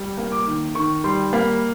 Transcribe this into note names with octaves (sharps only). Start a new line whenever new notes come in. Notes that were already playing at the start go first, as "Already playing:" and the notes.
Already playing: G3
A#3
D6
D#3
D#3 C#6
G3 C6
A#3 B5